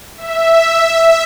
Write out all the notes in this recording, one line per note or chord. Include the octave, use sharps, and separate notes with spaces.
E5